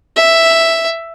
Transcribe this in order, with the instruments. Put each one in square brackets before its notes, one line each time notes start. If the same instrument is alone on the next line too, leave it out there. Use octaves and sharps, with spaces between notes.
[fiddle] E5